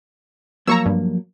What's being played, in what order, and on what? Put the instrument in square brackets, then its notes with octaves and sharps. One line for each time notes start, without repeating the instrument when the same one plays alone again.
[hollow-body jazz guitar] F3 F#3 A#3 [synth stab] A#5 C#6 E6
[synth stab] G2